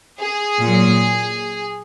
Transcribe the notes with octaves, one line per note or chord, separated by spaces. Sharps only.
G#4
A#2 F#3